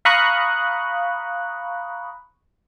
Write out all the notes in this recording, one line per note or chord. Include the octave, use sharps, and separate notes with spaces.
F5 A#5 B5 C#6 D#6 F#6